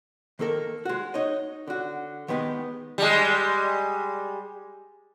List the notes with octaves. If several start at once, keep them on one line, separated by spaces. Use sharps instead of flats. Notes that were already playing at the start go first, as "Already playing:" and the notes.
D#3 A#3 A4 A#4
G#3 F#4
D#4 C#5 D#5
D3 F#4
D#3 G#3 B3 D#4 G4
G3 G#3